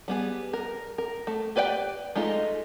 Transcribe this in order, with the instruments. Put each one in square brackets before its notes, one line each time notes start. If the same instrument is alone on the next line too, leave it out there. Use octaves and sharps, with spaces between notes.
[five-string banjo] G3 B3 G#4
A#4
A#4
A3
G4 B4 D5 E5 G5
G#3 A3 D#4 F4